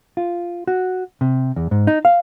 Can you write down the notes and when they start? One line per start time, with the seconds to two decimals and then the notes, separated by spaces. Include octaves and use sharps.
0.17 F4
0.67 F#4
1.21 C3
1.56 E2
1.71 G#2
1.87 D#4
2.05 F5